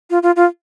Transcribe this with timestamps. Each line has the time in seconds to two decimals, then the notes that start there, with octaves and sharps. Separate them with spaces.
0.10 F4
0.23 F4
0.36 F4